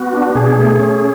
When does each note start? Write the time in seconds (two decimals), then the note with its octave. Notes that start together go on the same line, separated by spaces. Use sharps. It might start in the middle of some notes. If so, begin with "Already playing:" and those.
Already playing: B3 F#4
0.13 D4
0.30 F#4
0.35 B2 G#4
0.57 A3
0.80 C#4